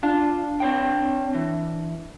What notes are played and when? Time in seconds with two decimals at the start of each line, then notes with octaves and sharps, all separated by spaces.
0.03 D4 F4
0.60 C4 C#5 G5
1.34 E3